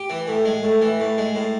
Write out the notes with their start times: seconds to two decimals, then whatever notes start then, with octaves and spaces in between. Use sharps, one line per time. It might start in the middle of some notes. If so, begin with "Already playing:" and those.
Already playing: G4
0.10 E3
0.28 A2
0.45 G#3
0.63 A2
0.81 E3
1.00 A2
1.18 G#3
1.35 A2